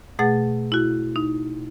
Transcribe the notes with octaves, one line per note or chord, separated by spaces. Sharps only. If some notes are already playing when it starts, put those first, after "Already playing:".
B2 A3 G#4 F#5 A6
E4 F#4
D#4